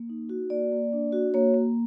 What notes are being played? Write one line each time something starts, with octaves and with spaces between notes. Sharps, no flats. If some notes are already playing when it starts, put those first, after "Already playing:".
Already playing: A#3
D#4
F#4
A#3 D5
A#3
D4
F#4
A#3 C#5
A#3